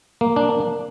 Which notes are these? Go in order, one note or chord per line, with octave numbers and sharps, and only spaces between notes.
A#3
D4